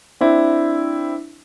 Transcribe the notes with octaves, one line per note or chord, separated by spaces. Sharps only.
C4 D4 E4